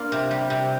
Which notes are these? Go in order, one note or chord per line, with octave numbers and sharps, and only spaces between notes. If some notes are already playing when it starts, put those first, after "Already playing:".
Already playing: A#3 D4 F4
C3
G3
C3